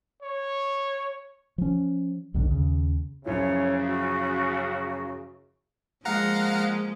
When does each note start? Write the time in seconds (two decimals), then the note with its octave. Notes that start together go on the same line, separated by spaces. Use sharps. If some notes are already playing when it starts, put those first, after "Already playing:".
0.22 C#5
1.58 F3 C#4
2.34 B1 F2 G#2 D3
2.48 D#2 C#3
3.25 F#2 C#3 F3 E4 C#5
3.88 F#4
6.05 F3 G#3 A#3 F5 F#5 A#5